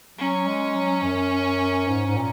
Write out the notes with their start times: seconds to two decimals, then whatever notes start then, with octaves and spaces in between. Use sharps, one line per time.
0.19 F#3 C#4
0.47 G#3
0.75 F#3
1.03 F#2
1.87 G#2
2.06 G#2
2.16 A#2